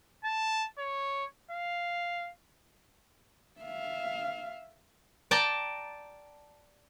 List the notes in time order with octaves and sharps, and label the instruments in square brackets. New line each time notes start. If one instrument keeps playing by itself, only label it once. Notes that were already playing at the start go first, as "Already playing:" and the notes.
[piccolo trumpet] A5
C#5
F5
[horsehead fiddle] E5 F5
[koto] D5 G5 A5 A#5